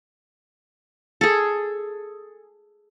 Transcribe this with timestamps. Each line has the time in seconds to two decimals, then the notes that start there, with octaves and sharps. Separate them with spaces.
1.21 G#4 A4